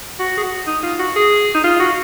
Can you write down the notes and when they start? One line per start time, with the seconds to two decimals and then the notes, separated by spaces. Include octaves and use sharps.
0.19 F#4
0.38 G#4
0.43 F#4
0.67 D#4
0.83 F4
0.99 F#4
1.16 G#4
1.55 D#4
1.64 F4
1.80 F#4